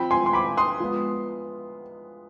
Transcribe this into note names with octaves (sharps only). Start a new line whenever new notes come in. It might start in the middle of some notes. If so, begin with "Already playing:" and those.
Already playing: F3 C4 F4 G5 B5
G#5 C6
C6
B5 D6
C6 D#6
F3 G#3 B3